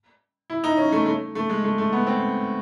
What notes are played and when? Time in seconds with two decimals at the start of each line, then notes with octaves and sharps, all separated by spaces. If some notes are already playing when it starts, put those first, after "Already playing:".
0.50 E4
0.64 D#4
0.77 C#4
0.92 A3
1.06 A3
1.35 A3
1.50 G#3
1.64 A3
1.78 A3
1.92 B3
2.07 C4